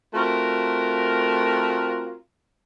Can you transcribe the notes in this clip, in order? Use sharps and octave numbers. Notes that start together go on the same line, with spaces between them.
A3 C4 F4 F#4 A#4